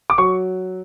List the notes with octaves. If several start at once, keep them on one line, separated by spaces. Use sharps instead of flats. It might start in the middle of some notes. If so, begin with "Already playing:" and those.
D6
F#3 C#6